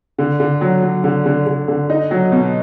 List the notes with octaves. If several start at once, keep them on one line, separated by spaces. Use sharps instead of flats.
D3
D3
F#3
F#3
D3
D3
D3
D3
D#4
F#3
B2